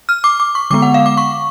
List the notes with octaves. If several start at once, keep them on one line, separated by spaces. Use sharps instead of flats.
F6
D6
D6
C#6
D3 G#3 B3 D6
F#5
F5
D6
C#6